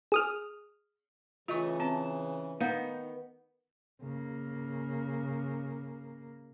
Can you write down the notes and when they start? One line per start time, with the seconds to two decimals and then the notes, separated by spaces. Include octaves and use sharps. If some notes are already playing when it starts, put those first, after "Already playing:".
0.12 G#4 D#6 F6
1.48 C#3 E3 A3 F4 D#5 C#6
1.80 C4 A5
2.61 D#3 B3 D#4 F5 F#5
4.02 C#3 A#3